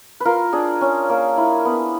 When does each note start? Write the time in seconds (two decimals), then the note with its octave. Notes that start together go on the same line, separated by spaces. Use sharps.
0.20 F4 A#4 B4
0.53 D4 G#4
0.81 C#4
1.09 A#3
1.37 E4
1.65 B3